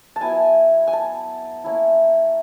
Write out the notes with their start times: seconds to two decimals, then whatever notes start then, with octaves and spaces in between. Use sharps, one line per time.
0.16 A5
0.21 F#3 B3 E4 G#5
0.87 G#5
0.93 A5
1.64 A#3 C#4 E4